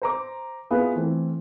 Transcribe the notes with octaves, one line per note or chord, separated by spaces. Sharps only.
C5 A#5 D6
B3 E4 F4 G#4 B4
E3 A3 C4